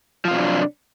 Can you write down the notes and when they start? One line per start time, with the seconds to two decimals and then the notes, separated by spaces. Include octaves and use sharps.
0.25 F3
0.28 F4
0.31 C3
0.34 F#3
0.38 D4